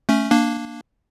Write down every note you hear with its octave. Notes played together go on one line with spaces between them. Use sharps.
A3 C#4
A#3 D4